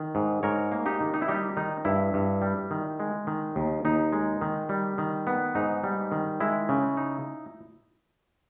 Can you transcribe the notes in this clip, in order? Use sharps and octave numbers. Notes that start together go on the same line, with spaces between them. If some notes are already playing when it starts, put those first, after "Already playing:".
Already playing: D#3
G#2
G#2 A#4 C#5
A#3
D#4 G4
D#3
D#4
E4
G3 D#4 G4
D#3 D#4
G2 E4
G2
G3
D#3
G#3
D#3
D#2
D#2 D#4
G#3
D#3
G3
D#3
B3
G#2 D#4
G3
D#3
G#3 E4
C#3
D#4